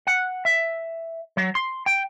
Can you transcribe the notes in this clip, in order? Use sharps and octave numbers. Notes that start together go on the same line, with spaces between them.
F#5
E5
F#3
C6
G5